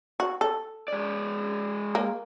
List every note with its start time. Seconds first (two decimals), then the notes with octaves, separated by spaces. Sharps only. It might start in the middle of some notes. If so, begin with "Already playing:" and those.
0.20 F#4
0.41 A4
0.88 G#3 D5
1.95 A#3